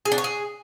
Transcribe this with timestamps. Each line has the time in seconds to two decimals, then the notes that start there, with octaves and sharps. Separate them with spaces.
0.05 G#4
0.12 D4
0.18 C#5
0.24 G#4